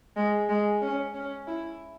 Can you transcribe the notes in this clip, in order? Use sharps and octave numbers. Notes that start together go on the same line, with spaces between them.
G#3
G#3
C#4
C#4
E4